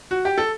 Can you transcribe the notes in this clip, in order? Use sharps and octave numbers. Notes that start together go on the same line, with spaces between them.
F#4
G4
A4